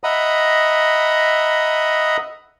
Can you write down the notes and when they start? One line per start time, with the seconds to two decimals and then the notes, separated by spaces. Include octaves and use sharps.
0.04 D#5 E5 F#5 A#5 B5 D#6